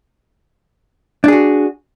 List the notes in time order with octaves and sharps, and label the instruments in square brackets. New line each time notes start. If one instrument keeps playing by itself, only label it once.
[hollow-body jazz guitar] D4
G#4
F#4